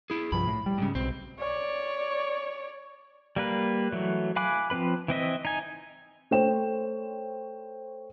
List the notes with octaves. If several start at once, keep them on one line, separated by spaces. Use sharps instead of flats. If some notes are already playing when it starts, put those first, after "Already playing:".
E4 G#4
C2 G2 F3 B5
A2
G3
G#2 C#3
B1 C4
C#5 D5
G3 A#3 B4
E3 F#3 A3
F5 G#5 B5 D6 F#6
F3 C4 B4 B5
E3 C4 D#5 E5
D#4 G#5
A3 C5 C#5 G5 E7